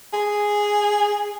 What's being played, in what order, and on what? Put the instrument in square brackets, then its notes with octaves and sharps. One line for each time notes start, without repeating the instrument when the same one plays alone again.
[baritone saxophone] G#4